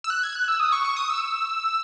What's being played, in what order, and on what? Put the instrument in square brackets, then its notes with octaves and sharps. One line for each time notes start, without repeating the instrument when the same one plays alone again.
[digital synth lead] E6
F#6
G#6
F#6
E6
D#6
C#6
C#6
D#6
E6